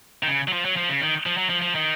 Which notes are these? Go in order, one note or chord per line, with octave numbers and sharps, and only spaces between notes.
D#3
C#3
F#3
F3
F#3
F3
C#3
D#3
F3
F#3
F3
F3
D#3